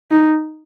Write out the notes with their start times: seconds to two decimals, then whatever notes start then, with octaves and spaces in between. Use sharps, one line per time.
0.11 D#4